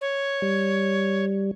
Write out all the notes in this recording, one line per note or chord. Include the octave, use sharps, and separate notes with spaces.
C#5
G3